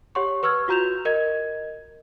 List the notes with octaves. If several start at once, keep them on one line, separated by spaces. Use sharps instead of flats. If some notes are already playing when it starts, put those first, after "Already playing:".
G4 C#5 F#5 C6 C#6
B4 C#6 E6 F6 G#6
F4 F#4 A#5 G6 E7 F7
A#4 D#5 G#6